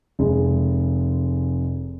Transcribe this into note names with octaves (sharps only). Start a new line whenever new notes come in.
F1 G#3